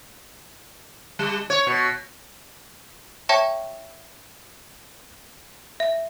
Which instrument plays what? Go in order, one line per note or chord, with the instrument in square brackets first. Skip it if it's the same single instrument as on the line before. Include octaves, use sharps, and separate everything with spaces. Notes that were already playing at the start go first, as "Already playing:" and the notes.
[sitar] G3
C#5
B2
[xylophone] C#5 E5 G5 A5 C#6
E5